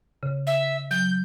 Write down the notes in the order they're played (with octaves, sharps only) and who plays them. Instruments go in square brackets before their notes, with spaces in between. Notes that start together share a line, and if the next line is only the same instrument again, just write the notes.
[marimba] C#3
[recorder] E5
[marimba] F#3 [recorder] G6